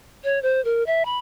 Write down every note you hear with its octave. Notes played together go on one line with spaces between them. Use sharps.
C#5
C5
A#4
E5
B5